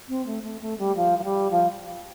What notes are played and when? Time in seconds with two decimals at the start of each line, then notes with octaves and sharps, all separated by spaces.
0.09 C4
0.26 A3
0.43 A3
0.61 A3
0.78 G3
0.96 F3
1.19 F3
1.24 G3
1.51 F3